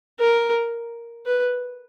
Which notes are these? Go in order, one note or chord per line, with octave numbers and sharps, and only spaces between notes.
A#4
B4